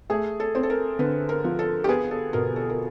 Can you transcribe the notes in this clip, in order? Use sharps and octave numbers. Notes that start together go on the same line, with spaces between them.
A3 G#4
A4
C4
A4
A#4
D3 B4
A#4
F3
A4
G4
B3 G#4
A4
B2 A#4
A4
A#4